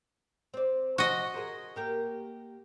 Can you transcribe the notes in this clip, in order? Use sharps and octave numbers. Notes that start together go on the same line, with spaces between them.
C4 D5
C3 F3 F#4 D#5
G#4 A#4 C5
A#3 G4 A#4